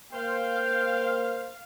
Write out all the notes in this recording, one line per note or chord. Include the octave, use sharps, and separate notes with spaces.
A#3 C5 F5 G5